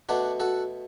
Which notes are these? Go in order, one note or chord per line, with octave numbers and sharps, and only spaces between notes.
B2 A3 D4 F#4
F#4 A4